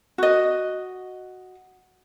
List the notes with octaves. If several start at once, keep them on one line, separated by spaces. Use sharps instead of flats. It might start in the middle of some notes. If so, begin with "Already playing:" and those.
F#4 D#5